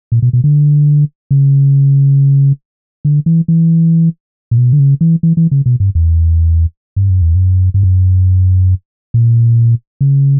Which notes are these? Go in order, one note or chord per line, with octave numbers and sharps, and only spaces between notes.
A#2
B2
B2
D3
C#3
D3
E3
E3
A#2
B2
D3
C#3
E3
E3
E3
C#3
B2
G2
E2
G2
F#2
E2
F#2
G2
F#2
A#2
C#3